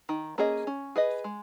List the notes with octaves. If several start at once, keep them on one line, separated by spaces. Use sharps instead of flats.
D#3
A#3 C#4 G#4 D#5
C#4
G#4 B4 D#5
G#3